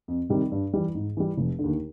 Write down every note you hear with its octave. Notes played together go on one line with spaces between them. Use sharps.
F2
C3 D#3 G3
G2
E3 G3
G#2
E3 G3
F1
D3
D#2